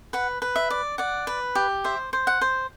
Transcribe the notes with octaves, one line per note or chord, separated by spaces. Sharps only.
B4 F#5
B4
E5
D5
D5 F#5
B4
G4
C5 E5
C5
F#5
C5